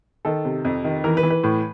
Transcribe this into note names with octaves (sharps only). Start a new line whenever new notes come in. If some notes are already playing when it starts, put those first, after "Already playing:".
D#3 A4
C3
F2
D#3
E3 A#4
B4
E3
B4
A2